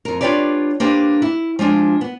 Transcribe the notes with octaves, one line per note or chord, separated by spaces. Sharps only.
F2 A#4
D4 F4 G4 B4 C#5 D5
A#3 D4 G4 B4 C5
E4
F3 G#3 D4 F4
B3